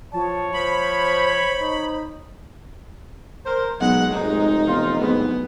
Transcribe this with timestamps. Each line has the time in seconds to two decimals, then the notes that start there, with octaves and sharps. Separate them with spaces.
0.13 F3 C#5 A5
0.54 F3 C5 B5
1.61 D#4
3.46 A#4 C5
3.81 B1 A#2 F#3 G#3 F#5
4.14 F1 G#2 D#4
4.67 E1 F4
5.00 D1 G#2 B3